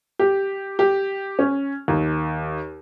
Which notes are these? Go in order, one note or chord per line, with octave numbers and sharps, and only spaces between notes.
G4
G4
C#4
D#2